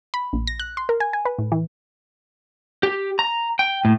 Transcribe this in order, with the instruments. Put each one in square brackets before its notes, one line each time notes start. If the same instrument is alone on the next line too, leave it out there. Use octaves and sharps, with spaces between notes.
[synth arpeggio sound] B5
A#1
A#6
F#6
C6
A#4
G#5
G#5
B4
A2
E3
[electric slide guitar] G4
A#5
G5
A2